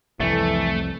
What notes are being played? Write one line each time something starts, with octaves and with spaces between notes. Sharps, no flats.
C2 F2 E3 A3